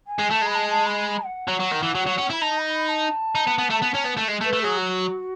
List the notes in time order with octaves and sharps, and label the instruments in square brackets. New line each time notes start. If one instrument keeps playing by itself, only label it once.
[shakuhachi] G#5
[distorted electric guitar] G#3
[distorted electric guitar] A3 [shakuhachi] A5
[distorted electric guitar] G#3 [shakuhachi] B5
[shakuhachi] A5
A5
B5
B5
F#5
[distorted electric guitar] F#3
F#3
D#3
E3
F#3
F#3
C#4
[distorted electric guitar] E4 [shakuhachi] B5
[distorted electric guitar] D#4 [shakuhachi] A5
[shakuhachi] B5
B5
A5
[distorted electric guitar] D#4
B3
B3
A3
B3
C#4
B3
A3
G#3
A3
[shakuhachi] B4
[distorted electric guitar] A3
[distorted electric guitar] F#3 [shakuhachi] G#4
[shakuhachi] F#4